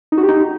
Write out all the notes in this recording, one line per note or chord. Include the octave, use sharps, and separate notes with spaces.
D#4
F#4
G4
D#4